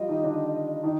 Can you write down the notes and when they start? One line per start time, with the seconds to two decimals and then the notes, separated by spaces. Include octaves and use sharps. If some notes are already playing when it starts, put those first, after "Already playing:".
Already playing: F3 G3 F4 G4 D#5
0.08 D#3 D#4
0.23 D3 D4
0.84 D#3 D#4